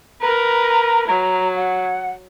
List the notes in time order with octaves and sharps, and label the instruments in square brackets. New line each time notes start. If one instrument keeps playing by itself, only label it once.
[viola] A#4 B4 [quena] A#5
[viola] F#3 [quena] A#5
[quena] F#5